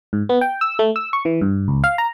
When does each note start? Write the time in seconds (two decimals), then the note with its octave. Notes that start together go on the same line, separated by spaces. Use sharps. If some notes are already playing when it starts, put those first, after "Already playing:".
0.13 G#2
0.29 B3
0.41 G5
0.61 E6
0.79 A3
0.96 E6
1.13 C#6
1.25 E3
1.41 G2
1.68 C#2
1.84 F5
1.98 A#5